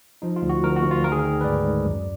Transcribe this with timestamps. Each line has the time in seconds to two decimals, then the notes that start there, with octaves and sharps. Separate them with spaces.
0.22 F3 D#4
0.36 F4
0.42 D2
0.49 F#4
0.64 D2 A#4
0.76 F#4
0.84 D2
0.91 F4
1.04 D#3 A#4
1.12 G#4
1.19 D#3 A#4
1.41 B4
1.44 G#2 D5
1.64 G#2
1.86 F#2